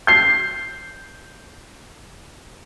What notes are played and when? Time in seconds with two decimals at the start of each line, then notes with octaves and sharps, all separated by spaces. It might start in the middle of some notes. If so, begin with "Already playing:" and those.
0.07 G6 C7